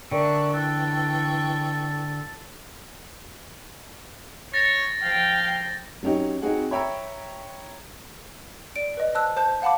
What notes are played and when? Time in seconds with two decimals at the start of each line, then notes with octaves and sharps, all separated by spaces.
0.11 D3 A#4 D5 E5 G5 A5 C#6 F#6
0.53 E3 A4 G5 C#6 E6 F#6
4.54 C#5 A6 A#6
5.03 F3 F5 G5
6.03 F#3 C#4 D#4 G4
6.42 C4 D#4 F#4 G#4 F#5
6.71 C#5 E5 G5 A#5 B5 E6
8.76 D5 D7
8.97 B4 D#5
9.15 C5 A5 E6 F#6
9.37 C5 A5 G6
9.62 F5 F#5 A5 B5 D6